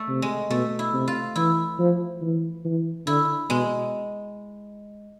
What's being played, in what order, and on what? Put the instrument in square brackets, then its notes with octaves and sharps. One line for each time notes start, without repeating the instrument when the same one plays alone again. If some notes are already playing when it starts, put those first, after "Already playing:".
Already playing: [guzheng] A3
[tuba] C3
[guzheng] G#3
[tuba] B2 [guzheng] A3
[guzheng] E4
[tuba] C3
[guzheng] F4
[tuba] E3 [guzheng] E4
[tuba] F3
E3
E3
[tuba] D3 [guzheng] E4
[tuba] B2 [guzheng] G#3